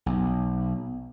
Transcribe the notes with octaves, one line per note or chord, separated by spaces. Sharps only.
B1